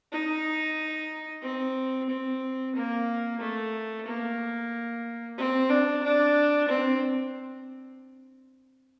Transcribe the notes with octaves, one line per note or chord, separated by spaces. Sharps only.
D#4
C4
C4
A#3
A3
A#3
C4
D4
D4
C4